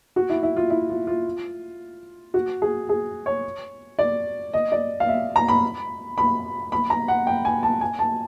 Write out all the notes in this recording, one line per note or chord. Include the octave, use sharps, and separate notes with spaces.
F#4
E4
E4
F4
E4
F4
F4
F#4
G#4
G#4
C#5
D5
D#5
D5
F5
E5
A#5
B5
B5
B5
A#5
F#5
G5
G#5
A5
G#5
A5